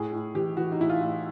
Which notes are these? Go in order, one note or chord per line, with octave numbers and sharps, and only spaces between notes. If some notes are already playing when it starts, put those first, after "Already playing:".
Already playing: A2 G#4
A2
E3 G4
E3 F#4
D#4
A2 E4
F4
A2